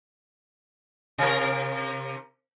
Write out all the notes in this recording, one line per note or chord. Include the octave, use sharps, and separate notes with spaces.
C3 A#4